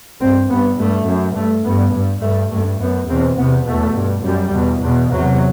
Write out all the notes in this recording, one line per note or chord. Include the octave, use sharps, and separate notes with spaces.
G2 C4
G2 B3
G2 A3
F#2
G2 A3
G2 B3
G2
G2 A3
G2 A3
F#2 B3
E2 B2 C4
E2 C3 B3
E2 B2 A3
G2
F#2 G3
E2 B2
E2 B2
E2 C3 F#3